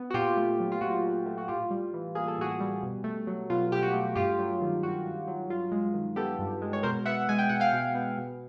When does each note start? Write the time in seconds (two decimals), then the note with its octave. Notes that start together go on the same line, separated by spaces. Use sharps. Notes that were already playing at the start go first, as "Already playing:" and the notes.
Already playing: B3
0.10 F#4
0.14 A#2 F4 G4
0.37 A3
0.60 F#3
0.72 F4
0.81 A#2 F#4
1.05 A#2
1.26 A3
1.38 F#4
1.48 A2 F4 G4
1.71 G3
1.94 E3
2.15 A#3 G#4
2.28 A4
2.38 A2 F#4 G#4
2.60 G3
2.83 B2
3.04 A3
3.27 F#3
3.50 B2 F4
3.72 B2 G4
3.83 F#4
3.93 A3
4.15 G2 F4 G4
4.39 F#3
4.61 D#3
4.83 G2 F#4
5.05 G2
5.28 F#3
5.50 G2 F4
5.72 G#3
5.94 D#3
6.16 B3 G4 A4
6.39 G2
6.62 G#3
6.73 C#5
6.83 B2 A#4 C5
7.05 B3 E5 F#5
7.29 G#3 G#5
7.38 G5
7.49 B2 F#5
7.60 F5 G5
7.73 B2
7.95 B3
8.18 B2